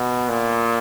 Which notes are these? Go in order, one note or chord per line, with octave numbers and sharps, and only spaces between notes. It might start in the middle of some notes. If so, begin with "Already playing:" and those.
Already playing: B2
A#2